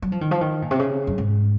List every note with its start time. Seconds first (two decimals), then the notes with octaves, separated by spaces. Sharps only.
0.02 F#3
0.12 F3
0.21 D#3
0.31 F3
0.41 D#3
0.62 A#2
0.71 C3
0.79 C#3
1.07 F#2
1.18 G#2